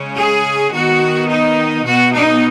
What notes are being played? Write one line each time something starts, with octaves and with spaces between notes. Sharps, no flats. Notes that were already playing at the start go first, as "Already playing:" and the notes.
Already playing: C#3 G#3 C#4
G#4
D#3 B3 F#4
D#4
B2 B3 F#4
D#4